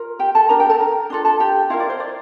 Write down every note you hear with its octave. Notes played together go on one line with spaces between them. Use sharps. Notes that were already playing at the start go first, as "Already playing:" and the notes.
Already playing: F4 A#4
G4 G5
A4 A5
D4 G4 A#4 A#5
G4 G5
A4 A5
A#4 A#5
D4 F4 A4
A4 A5
G4 G5
E4 F4 A#4 F5
D5
C5
D5